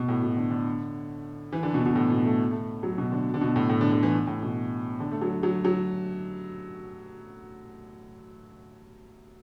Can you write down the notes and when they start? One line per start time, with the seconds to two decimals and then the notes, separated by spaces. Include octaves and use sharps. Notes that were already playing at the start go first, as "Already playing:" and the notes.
Already playing: B2
0.08 A2
0.23 B2
0.37 D3
0.51 D3
1.53 E3
1.63 D3
1.74 B2
1.86 B2
1.95 A2
2.10 B2
2.25 A3
2.51 A3
2.83 F#3
2.98 B2
3.12 D3
3.34 D3
3.41 B2
3.56 A2
3.69 A2
3.81 D3
3.92 D3
4.03 E3
4.27 A2
4.42 B2
5.00 D3
5.11 A3
5.22 F#3
5.43 F#3
5.65 F#3